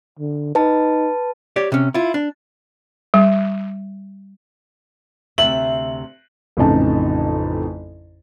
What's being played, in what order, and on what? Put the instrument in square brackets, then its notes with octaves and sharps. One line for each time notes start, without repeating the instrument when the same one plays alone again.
[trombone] D3
[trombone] D#4 [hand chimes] B4 A5
[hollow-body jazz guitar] G4 C#5 D5
C3 C#4
E4 F4
D4
[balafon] G3
[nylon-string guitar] D2 C3 E5 [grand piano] F#7
[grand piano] A1 F2 C#3 D#4 A5